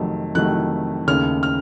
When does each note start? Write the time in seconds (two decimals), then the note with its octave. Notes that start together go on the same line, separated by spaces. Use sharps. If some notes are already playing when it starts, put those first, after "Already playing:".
Already playing: F2 C3 D#3 F#3 A3
0.35 F2 C3 D#3 F#3 A3 F#6
1.07 D#2 C#3 A3 F6
1.43 F6